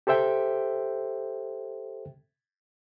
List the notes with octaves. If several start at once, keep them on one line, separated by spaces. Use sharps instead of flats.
G4 A4 C5 E5 G5